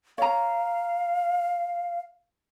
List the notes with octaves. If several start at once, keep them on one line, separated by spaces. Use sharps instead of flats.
C#5 F5 A#5